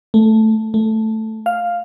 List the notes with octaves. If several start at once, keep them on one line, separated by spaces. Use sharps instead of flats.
A3
A3
F5